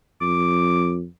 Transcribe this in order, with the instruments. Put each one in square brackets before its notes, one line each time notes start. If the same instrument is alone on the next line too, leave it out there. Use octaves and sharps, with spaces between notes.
[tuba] F2 [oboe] D6